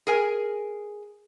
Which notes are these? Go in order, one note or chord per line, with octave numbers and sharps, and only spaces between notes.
G#4 A#4 G#5